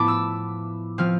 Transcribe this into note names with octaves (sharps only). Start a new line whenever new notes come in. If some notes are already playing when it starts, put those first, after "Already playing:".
Already playing: A2 F3 B3 A5 B5 D6
E6
F3 C4 F6